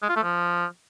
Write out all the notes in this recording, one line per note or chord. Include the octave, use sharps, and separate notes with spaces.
G#3
F4
A3
F3